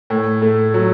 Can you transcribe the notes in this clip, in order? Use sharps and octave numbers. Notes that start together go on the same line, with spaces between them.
A2
A3
F#3